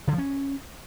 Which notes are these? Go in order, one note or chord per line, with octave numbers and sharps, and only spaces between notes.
D3
F3
C#4